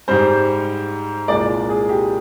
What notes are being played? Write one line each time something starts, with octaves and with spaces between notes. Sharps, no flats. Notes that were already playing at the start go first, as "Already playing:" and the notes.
G#2 G3 C5
C2 A#2 G#3 D5
G#4
G4